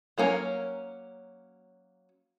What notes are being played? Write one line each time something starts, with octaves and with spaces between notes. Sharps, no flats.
F#3 A#3 C#4 A#4